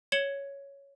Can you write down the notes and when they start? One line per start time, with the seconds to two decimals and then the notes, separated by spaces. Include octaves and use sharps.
0.12 C#5 G#6 C#7 E7 F#7 G7